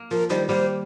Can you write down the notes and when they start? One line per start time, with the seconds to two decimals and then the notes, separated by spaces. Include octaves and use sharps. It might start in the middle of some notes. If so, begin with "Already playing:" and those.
Already playing: A#3
0.11 F3 A#4
0.30 D#3 G3 C5
0.48 G3 A#3 C5